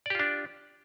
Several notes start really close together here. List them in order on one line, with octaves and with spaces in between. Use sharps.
D5 G4 F4 D4